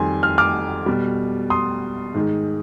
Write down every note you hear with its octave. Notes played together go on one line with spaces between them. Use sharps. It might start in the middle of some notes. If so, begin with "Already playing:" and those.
Already playing: F2 D#3 G3 G#5 C6
F6
D6 F6
B2 G3
C6 D#6
G#2 D#3 G#3